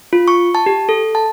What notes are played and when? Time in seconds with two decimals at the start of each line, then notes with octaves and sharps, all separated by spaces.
0.13 F4
0.28 C#6
0.55 A5
0.66 G4
0.89 A4
1.15 A5